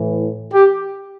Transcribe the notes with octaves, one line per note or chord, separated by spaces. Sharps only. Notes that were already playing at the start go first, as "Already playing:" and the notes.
Already playing: A2 E3
G4